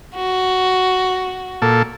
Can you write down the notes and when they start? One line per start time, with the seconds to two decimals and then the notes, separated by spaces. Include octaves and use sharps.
0.15 F#4
1.62 A#2 A4